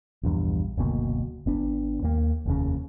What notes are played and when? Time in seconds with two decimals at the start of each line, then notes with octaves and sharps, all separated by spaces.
0.23 A#1 E2 G2
0.77 F#1 D2 B2 A#3
1.46 G#1 B3 D4
2.02 D#2 A#3
2.45 F1 D#2 C#3